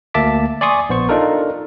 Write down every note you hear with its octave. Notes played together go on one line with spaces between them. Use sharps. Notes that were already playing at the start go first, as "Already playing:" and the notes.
D2 A#3 E5 A5 D6 B6
D5 G#5 C6 C#6 D#6
A#1 B3 C5 C#6
D4 D#4 F4 A4 A#4